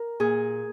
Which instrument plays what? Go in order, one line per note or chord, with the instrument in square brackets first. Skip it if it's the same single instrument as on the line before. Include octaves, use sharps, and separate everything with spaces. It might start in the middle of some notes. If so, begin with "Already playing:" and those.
Already playing: [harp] A#4
A#2 G#4